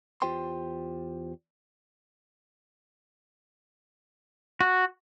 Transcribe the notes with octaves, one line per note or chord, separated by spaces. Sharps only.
E2 F4 G4 C5 G5 C6
F#4